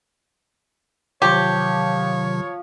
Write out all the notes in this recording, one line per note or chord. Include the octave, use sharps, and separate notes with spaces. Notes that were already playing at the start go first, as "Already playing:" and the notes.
C3 D#3 F3 F#3 G4 C#5